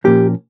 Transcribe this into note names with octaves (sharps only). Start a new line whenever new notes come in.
A#2 F3 A#3 C#4 G4